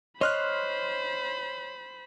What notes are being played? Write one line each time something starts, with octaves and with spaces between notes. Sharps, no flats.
C5 C#5 D#5 B5 C6 F6 F#6